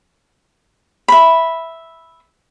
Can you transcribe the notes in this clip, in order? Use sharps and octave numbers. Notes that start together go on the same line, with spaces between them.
E5 B5